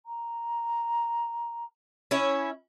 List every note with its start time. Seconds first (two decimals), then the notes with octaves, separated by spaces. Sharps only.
0.06 A#5
2.11 C#4 E4 C#5